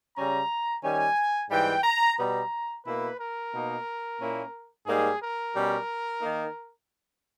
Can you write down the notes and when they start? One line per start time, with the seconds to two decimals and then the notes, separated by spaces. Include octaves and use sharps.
0.16 C#3 G3 C#4 A#5
0.83 D#3 G3 C#4 G#5
1.50 G#2 E3 G3 G5
1.84 A#5
2.18 B2 G3 B3 A#5
2.85 B2 A#3 E4 B4
3.19 A#4
3.52 B2 A#3 D#4
4.19 A#2 A#3 C#4 E4
4.86 G#2 G3 A#3 D#4 G#4
5.20 A#4
5.54 B2 G3 C#4
6.21 D#3 A#3 D#4